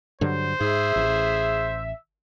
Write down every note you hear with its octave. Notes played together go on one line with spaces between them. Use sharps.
G2 D3 F#3 C5
G#2 G#4 E5
A1